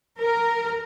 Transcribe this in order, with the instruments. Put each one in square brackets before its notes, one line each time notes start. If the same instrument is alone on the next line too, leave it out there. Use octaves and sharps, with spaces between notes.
[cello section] A#4